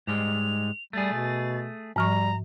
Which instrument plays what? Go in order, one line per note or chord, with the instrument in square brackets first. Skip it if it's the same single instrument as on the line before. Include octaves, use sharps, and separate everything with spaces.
[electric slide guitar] G#2 G3 G#3 [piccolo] F7
[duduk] G3 [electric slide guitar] A3 G#4 [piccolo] A6
[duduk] B2
[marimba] G#2 F3 C#6 [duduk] G3 [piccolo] A#5